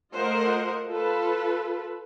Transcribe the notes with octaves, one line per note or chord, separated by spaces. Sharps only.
A3 F4 A#4 C5 D#5 F#5
F4 A4 B4